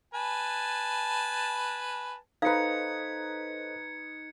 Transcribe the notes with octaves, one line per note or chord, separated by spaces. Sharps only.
B4 G#5 A5
D#4 A4 B4 C5 D#5 F5 G#6 C#7